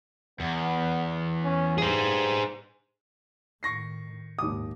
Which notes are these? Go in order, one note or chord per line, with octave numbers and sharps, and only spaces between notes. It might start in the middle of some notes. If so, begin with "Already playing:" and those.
E2 B3
C#4
G2 G#4 C5
A2 D#3 C#6 A#6 C7
A#1 D#2 G#2 D6 D#6